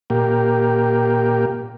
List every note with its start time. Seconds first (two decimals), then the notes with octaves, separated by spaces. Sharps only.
0.10 A#2 A#3 G4